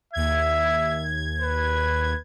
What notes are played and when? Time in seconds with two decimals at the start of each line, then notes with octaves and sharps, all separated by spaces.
0.13 D#2 E5 G#6
1.41 B4